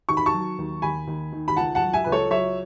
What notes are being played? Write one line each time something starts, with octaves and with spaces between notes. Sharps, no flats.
D#3 C#6
B5
A5 C#6
F#3
D#2
D#2 G#5 B5
D#2
D#3
B5
C#2 F#5 A5
F#5 A5
F#3
E5 G#5
C#2 B4
A4 C#5
F#3 C#5 E5